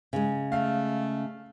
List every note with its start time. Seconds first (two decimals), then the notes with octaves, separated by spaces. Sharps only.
0.13 C#3 G#3
0.52 A3 F5